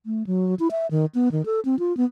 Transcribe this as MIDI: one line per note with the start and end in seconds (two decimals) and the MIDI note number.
0.06 0.23 57
0.27 0.55 54
0.59 0.68 64
0.71 0.87 76
0.91 1.06 51
1.15 1.32 59
1.32 1.45 51
1.46 1.60 69
1.65 1.78 60
1.79 1.95 65
1.97 2.05 59